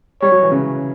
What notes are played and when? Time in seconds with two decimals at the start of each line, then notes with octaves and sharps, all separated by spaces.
0.22 G3 C#5
0.32 F#3
0.42 E3
0.52 C#3